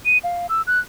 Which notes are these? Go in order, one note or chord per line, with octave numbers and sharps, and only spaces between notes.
D#7
F5
E6
F#6